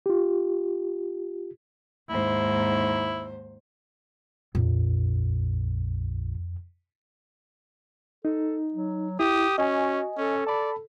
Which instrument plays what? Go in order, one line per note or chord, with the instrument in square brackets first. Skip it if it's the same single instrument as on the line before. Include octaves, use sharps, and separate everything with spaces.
[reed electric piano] F4 G4
[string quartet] D#2 G#2 C5 [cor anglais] E4
[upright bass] A#1 [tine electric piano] F2
[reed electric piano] D#4 [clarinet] A4
[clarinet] F#3
[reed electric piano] E4 [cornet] G4 [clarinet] D#6
[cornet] C#4 [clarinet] F#4 [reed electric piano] D#5 G#5
[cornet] C#4 [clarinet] A4
[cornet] D5 [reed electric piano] A5 B5